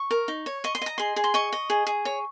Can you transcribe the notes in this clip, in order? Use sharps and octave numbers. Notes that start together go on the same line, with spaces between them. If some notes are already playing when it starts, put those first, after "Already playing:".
Already playing: C#6
A#4
D#4
C#5
D#5 C#6
C6
D#5 A#5
G#4 C6
G#4
C6
D#5 C#6
D#5
G#4
G#4
C#5